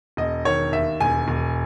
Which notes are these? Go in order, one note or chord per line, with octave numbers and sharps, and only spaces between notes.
E1 D#5
D#3 C#5
D#2 E5
E1 G#5
E1